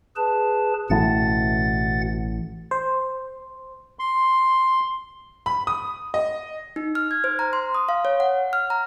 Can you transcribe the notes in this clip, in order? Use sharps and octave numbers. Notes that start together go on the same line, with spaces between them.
G#4 B4 A5
A1 B2 E3 A3 F#5 A6
C5
C6
B5
D#6
D#5
D#4
F6
G#6
C5
A#5
C6
D#6
F5
C#5
F#5
F6
A#5